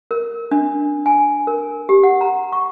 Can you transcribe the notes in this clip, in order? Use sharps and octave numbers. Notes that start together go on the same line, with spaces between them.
A#4
D4
G#5
A#4
G4
F#5
A#5
C#6